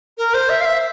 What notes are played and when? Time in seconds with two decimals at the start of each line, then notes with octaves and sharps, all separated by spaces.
0.18 A#4
0.34 C5
0.49 E5
0.61 F5
0.65 E5